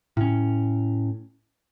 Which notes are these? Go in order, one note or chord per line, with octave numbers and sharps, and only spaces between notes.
A2 C#4